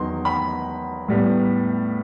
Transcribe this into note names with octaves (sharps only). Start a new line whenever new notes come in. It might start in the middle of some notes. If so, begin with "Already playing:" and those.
Already playing: E2 D#3 F#3 B3 C6
B5
A2 G3 B3